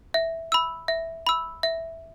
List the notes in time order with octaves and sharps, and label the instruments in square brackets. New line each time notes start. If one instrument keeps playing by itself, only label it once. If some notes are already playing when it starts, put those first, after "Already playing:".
[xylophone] E5
B5 E6
E5
B5 E6
E5